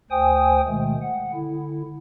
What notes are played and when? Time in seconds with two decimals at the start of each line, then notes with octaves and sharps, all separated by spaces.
0.11 D2 C5 G5 G#5 D#6
0.67 B2 D#3 G#3 A3
1.02 F#5
1.34 D3 E4